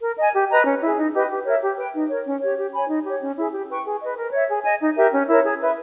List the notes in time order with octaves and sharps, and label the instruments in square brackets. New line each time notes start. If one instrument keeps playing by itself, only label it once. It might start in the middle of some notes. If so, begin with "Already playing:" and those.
[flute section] A#4
D#5 G#5
G4
B4 D#5 A#5
C#4
E4 G#4
D#4
G4 B4 D#5
G4
A#4 C#5 E5
G4
B4 G5
D#4
A#4 C#5
C#4
G4 C#5
G4
C#5 G#5 B5
D#4
G4 C#5
C#4
E4 G#4
G4
B4 G5 C#6
G#4
B4 D#5
A#4
C#5 E5
G#4
D#5 G#5
D#4
G4 A#4 E5
C#4
E4 A#4 C#5
G#4
B4 E5